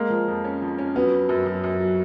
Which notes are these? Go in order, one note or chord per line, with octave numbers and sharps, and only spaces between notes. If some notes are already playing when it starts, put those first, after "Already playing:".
Already playing: G#3 A#3
F3
F2
C#4
F2
C#4
F#3 B3
F#3
F#2
F#2
F#2
F#3